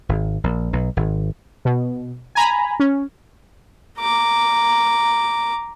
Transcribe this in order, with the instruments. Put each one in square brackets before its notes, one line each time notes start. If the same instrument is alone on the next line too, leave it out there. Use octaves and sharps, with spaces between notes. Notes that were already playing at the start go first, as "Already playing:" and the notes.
[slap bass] G#1
A#1
B1
G#1
[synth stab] B2
G#5 A#5 B5
C#4
[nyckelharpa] A#5 D6